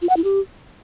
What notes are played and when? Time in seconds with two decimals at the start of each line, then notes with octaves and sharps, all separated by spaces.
0.02 F4
0.09 F#5
0.17 E4
0.24 G4